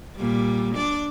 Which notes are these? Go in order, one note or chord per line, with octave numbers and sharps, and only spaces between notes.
A#2 G3
D4 D5